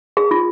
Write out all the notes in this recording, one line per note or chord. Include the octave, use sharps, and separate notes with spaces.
G#4
F4